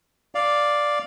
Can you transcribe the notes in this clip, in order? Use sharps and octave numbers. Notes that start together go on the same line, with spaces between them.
D5 F5